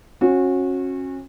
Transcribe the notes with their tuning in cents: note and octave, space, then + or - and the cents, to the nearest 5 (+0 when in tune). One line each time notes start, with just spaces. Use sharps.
C#4 -30 F#4 -20